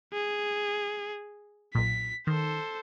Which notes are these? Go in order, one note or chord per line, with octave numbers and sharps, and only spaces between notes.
G#4
B1 A#2 B6
D#3 A4 C5